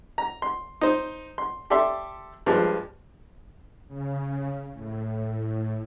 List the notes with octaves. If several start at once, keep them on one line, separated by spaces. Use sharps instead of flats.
A#5
C6
D#4 C5
C6
G4 A4 D5 E5 C6
G2 F3 G#3
C#3
A2